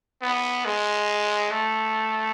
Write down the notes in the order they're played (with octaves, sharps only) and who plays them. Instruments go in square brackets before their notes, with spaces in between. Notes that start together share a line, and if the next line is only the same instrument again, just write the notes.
[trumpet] B3
G#3
A3